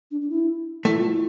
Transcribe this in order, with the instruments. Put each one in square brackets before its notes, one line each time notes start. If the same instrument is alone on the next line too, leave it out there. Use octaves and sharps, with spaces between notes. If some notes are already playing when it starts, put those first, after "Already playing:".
[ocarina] D4
D4
E4
[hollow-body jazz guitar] A3 [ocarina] E4
[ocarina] F4
E4